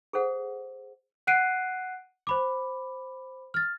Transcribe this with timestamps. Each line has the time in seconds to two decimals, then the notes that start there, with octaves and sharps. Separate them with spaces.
0.13 G#4 A4 C5 F#5
1.27 F#5 F#6 C7 D7 D#7
2.27 C5 B5 D6
3.54 F6 A6